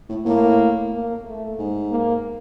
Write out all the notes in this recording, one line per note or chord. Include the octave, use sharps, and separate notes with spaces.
A2
A2 A#3
A#3
A3
G#2
A#3